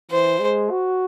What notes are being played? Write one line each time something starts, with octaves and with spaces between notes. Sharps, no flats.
E3 C5
G#3
F#4